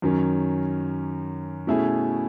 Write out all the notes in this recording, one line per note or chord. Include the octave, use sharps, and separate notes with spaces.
F#2 D#3 F#3 C#4
B2 A3 C#4 E4 G#4